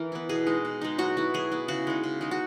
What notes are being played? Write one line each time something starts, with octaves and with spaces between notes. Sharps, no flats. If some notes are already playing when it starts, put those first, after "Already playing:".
Already playing: E3 A#4
B3 E4
B2 G#4
G#3 D#4
B2
G#3 D#4
F#3 F#4
B3 E4
F#3 G#4
B3 E4
C#3 F#4
G#3 D#4
C#3
G#3 D#4
F#4